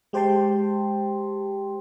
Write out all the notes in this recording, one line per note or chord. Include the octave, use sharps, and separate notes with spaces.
G#3 G4 C5 G5 A5 C6